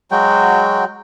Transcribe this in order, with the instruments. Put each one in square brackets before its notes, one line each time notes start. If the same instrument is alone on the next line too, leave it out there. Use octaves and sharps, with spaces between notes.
[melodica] F#3 G#3 F#4 G5